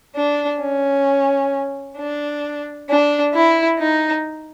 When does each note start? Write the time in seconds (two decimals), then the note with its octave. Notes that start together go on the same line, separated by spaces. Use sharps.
0.15 D4
0.60 C#4
1.97 D4
2.88 D4
3.33 E4
3.78 D#4